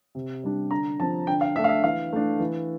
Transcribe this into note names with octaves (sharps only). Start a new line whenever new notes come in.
C3
G3 D4
D3 A#5
F3 C4 A5
D3 G5
F5
A3 D4 E5
F5
E5
E3 F5
A3 D4
E3